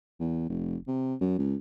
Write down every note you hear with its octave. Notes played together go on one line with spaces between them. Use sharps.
E2
F1
C3
F#2
C#2